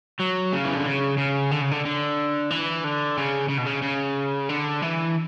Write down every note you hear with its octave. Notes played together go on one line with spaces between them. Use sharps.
F#3
C#3
E3
D3
C#3
C#3
D3
C#3
D3
D3
E3
D3
C#3
C#3
B2
C#3
C#3
D3
E3